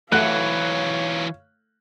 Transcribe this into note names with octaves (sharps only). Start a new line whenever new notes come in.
E3 F#3 A3 C#5 F5 F#5 F#6